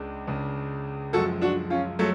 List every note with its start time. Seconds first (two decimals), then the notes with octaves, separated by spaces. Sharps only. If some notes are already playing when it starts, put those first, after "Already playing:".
Already playing: C#2 C#3 G#3 D4
0.27 C#2 C#3 G#3 D4
1.13 F#2 F3 G#3 F#4 A4
1.41 D4 F#4
1.70 C#4 F4
1.99 F3 F#3 G#3 A3